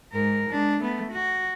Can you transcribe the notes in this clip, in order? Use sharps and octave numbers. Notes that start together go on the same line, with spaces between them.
G#2 A#4
G#3 D4
A3 B3
F#4